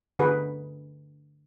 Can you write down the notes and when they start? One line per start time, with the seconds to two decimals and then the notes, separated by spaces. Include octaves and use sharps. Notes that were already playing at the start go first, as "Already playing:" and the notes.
0.19 D3 F#4 G#4 B4